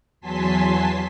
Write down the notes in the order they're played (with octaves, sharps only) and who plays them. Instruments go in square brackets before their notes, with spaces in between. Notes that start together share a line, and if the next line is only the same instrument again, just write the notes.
[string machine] E2 F#3 G#5 A5 C6 B6